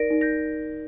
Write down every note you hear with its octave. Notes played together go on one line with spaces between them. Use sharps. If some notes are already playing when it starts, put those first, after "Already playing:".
Already playing: D#4 A#4 D5 A#6 D7
D#4
G6 A#6